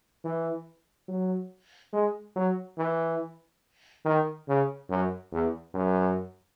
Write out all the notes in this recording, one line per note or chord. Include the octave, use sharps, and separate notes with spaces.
E3
F#3
G#3
F#3
E3
D#3
C#3
F#2
E2
F#2